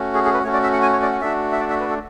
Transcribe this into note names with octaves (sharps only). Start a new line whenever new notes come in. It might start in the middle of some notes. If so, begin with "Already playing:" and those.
Already playing: A3 C#4 F#4
G#4
G#4
B4
A3 C#4 F#4 C#5
D5
E5
F#5
G#5
C#5
D5
F#5
A3 D4 F#4 E5
E5
D5
E5
B4
A4